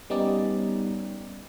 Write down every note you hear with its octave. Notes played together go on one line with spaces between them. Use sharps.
G3 B3 C#4 D#4 G4 D5